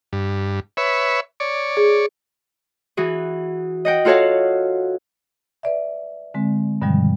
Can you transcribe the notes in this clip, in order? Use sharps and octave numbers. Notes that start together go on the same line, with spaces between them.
G2
B4 C#5 E5
C#5 D5
G#4
E3 F#4 G#4
D#5 F#5 G5
F4 F#4 A4 C#5 F5 F#5
B4 D5 E5
D3 G#3 C4
G2 B2 D3 D#3 F3 G3